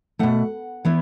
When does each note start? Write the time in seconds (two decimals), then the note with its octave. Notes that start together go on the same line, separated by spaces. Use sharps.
0.19 B2 F#3 A3 F#5
0.85 E3 B3 E4